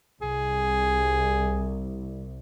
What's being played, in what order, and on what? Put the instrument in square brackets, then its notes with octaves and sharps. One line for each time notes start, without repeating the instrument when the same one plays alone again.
[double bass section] C2 [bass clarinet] G#4